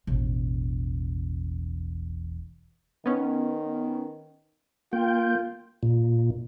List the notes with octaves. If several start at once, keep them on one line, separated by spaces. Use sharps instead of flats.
E1 A1
D#3 B3 C#4
A#3 F4 G5
A#2